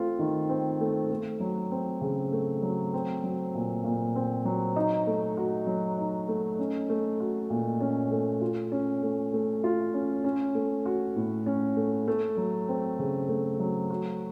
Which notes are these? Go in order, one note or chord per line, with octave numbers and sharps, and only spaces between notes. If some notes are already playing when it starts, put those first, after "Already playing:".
Already playing: A3 C4 F4
D#3
C4
A3
A3
F#3
C4
C#3
A3
F#3
C4
F#3
A#2
A#2
C4
F#3
D#4
A3
F#4
F#3
D#4
A3
C#4
A3
F#4
A#2
C#4
A3
F4
C#4
A3
A3
F4
C#4
C#4
A3
F#4
A2
C#4
A3
A3
F#3
C4
C#3
A3
F#3
F#4